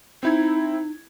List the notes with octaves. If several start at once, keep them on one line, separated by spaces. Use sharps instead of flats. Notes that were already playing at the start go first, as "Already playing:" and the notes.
C4 D#4 E4 G#6